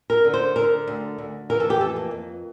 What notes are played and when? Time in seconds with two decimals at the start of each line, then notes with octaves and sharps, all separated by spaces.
0.10 A#4
0.25 D3
0.34 C5
0.56 D3 A#4
0.88 D2
1.18 D2
1.50 E3 A#4
1.60 A4
1.70 G4
1.81 F2 A4
1.96 A#3
2.11 F2